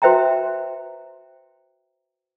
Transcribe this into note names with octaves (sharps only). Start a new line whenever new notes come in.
F#4 B4 C5 E5 G5 A#5